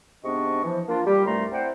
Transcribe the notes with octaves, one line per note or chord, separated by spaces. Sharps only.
G#2 C3 B3 D4 D#5 C#6
E3 F3
A#3 D4 F4
G3 G4
C2 G2 G3 A3 A#5 C6
C4 E4 C5 D5 F#5 G5